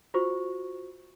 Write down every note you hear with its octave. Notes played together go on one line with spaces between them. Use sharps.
F4 F#4 C5 C#6